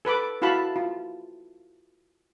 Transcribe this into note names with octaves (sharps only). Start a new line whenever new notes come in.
A4 B4 B5 D6
E4 F#4 F5 A5 B5
F4